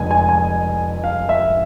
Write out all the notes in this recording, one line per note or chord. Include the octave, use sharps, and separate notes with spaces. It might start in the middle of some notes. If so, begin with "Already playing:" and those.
Already playing: F1 F2 D3 G#3 G#5
G#5
G#5
F5
E5